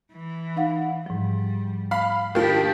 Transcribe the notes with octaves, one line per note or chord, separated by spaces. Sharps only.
E3
D#4 F5 F#5
G#2 F3 G3
F5 B5
D#3 F3 D4 G4 F5